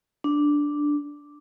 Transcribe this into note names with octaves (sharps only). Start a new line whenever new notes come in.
D4